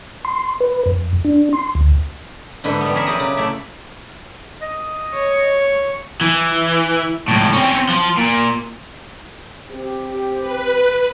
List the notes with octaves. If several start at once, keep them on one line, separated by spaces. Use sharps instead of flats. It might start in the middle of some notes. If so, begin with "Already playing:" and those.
C6
B4
F2
D4
C6
D2
G#2 D3 E4 A4 B4
G3 B3
C#4 G#4 A#4 C#5 E5 B5
F#3 E4 G4 D5 D#5
C#3
A3 E4 D5 E5
D#5
C#5
E3
C#2 A2
C4 C#4
F3 F4
A#2
C4 G4
B4